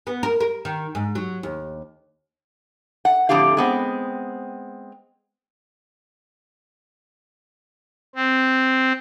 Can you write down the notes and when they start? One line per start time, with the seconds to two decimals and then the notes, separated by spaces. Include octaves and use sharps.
0.07 B3
0.23 A#4
0.40 A#4
0.65 D#3
0.95 G#2
1.15 F#3
1.43 D#2
3.05 F#5
3.29 F2 A2 D3 G4 F5
3.57 G#3 B3 C4
8.15 C4